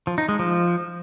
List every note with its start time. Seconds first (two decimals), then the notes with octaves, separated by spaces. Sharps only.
0.07 F3
0.18 D#4
0.29 G#3
0.39 F3